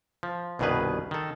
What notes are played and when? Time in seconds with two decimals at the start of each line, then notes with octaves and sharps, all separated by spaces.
0.23 F3
0.59 C2 G2 B2 D#3 G#4 B4
1.11 D#3 A4